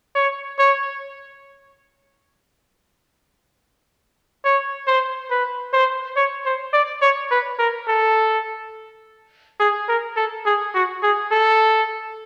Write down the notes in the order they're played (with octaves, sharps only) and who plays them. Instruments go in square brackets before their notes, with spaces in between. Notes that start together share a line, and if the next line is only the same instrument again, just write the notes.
[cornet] C#5
C#5
C#5
C5
B4
C5
C#5
C5
D5
C#5
B4
A#4
A4
G#4
A#4
A4
G#4
F#4
G#4
A4